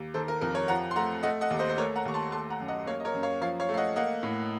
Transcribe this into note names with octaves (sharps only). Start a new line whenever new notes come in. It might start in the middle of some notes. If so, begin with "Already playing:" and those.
Already playing: D#2
D#3 A4 C5
A#4
F2 A#4
A#4 C#5
F3 F#5 A#5
C6
A3 F#5 A#5
A3 D#5 F#5
D#5 F#5
D#2
C5 D#5
C5
A3 A#4 C#5
F#5 A#5
D#2 C#6
A5 C6
A3 A5 C6
F#5 A#5
F#2
D#5 F#5
A#3 C#5 F5
D#5
A#4 C#5
F#2
C#5 F5
F3 C#5 F5
C#5 F5
A3
F5
D#5 F#5
A#3 D#5 F#5
A2